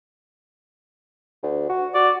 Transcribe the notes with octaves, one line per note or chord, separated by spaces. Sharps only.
D2
F#4
F#4 D5